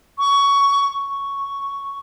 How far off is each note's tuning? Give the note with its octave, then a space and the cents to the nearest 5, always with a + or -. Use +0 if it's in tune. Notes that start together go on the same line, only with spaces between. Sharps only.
C#6 +15
C#6 +5